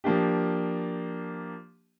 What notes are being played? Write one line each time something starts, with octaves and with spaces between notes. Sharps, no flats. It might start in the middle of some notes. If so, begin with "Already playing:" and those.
F3 A#3 D4 G4